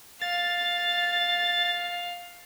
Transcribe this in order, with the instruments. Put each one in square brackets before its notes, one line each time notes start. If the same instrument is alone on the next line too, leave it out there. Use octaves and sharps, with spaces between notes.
[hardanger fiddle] F5 [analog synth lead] A6